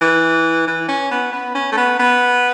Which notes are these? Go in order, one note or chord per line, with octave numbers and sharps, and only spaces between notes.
E3
E3
C#4
B3
B3
C#4
A3
B3
B3